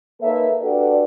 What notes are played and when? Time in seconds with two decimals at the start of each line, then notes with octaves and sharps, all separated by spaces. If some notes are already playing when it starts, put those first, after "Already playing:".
0.22 A#3 D#4 A4 B4 C#5 E5
0.62 D4 F#4 G4 A4 B4 D5